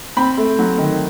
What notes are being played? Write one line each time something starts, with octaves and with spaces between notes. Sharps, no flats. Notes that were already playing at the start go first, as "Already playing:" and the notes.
C4 B5
A3
F#3
D#3